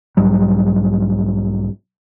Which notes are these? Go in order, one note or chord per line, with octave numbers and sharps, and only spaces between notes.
B1 G#2 F#3 G3